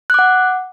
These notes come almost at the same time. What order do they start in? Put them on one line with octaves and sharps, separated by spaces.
F#6 D6 F#5